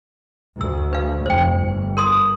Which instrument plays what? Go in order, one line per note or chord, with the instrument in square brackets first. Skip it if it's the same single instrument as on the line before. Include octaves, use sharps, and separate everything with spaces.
[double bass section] D2 [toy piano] E6
[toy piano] B4 F5
[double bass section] F1 [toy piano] C5 G5
[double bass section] G1
[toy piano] A#4 C6 D#6